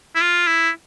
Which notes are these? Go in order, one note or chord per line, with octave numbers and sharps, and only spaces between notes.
E4
F4
E4